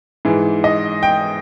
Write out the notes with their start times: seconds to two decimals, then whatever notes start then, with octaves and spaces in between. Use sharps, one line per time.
0.25 G#2 E3
0.64 D#5
1.03 G5